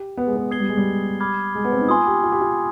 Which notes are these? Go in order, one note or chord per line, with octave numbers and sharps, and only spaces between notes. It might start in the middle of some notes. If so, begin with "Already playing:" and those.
Already playing: G4
B3
G#3
B3
B3 D#6 G#6 C7 G7
G3
G#3
G3
B5 D6 F6 G#6
G#3
B3
C4
D#4
F4 G#5 C6 D#6
G4
F4
G4
F4